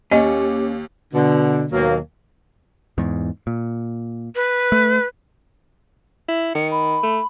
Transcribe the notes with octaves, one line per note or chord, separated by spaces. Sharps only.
D#2 C#4 G4 D#5
B2 D3
D#2 B2 F#3 A#3
E2 G#2
A#2
B4
A3
E4
D#3 C#7
B5
A3